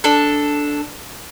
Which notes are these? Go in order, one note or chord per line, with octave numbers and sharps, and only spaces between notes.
D4 A4